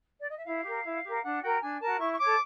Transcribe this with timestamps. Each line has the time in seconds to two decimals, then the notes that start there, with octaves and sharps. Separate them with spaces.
0.21 D5
0.29 D#5
0.37 E5
0.45 E4 F5
0.64 G4 A#4
0.84 E4
1.03 G4 A#4
1.23 D4 F#5
1.42 F#4 A#4 G5
1.61 D4 G#5
1.81 F#4 A#4 A5
2.00 E4 C#6
2.12 C#6
2.19 A4 C#5 D6